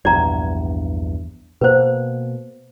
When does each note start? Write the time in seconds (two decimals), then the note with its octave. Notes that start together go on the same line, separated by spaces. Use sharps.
0.05 A#1 E2 G2 D5 A#5
1.61 B2 A#3 B4 C5